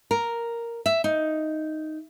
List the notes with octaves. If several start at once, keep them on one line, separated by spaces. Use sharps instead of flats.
A#4
E5
D#4